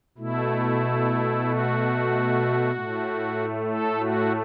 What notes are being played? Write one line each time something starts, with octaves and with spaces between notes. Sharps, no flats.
B2 A3 E4
F#4
A2 A3
A4
F#4